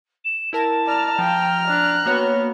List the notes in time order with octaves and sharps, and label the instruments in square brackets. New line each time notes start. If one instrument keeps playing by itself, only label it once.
[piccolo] E7
[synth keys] E4 A#4 E7 [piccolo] A5
[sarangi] D5 [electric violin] A#5 F6
[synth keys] F3 [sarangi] G5
[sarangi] D4 [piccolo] F#6
[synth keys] A#3 F#4 C#5 [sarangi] B3